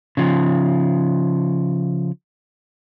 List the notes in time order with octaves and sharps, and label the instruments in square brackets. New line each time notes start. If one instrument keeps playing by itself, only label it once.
[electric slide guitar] C#3 F3